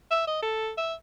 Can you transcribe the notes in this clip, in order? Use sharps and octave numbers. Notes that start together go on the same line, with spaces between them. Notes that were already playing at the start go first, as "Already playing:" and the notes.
E5
D#5
A4
E5